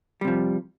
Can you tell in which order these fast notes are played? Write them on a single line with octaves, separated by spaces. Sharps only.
G3 C3 F3